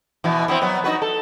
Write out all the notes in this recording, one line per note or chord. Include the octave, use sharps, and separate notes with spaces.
B2 E3
E3 B3 C4
F#3 B3
D#4 F#4 B4
A4